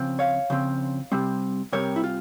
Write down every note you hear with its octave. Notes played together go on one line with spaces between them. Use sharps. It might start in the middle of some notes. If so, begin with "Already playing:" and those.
Already playing: C#3 F3 C4
C#5 F5
C#3 F3 C4
C3 G3 C4
C3 G3 C4 A#4 C#5
E4
F4